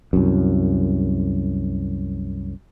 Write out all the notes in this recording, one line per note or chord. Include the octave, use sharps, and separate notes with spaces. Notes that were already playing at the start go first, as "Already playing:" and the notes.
C2 F#2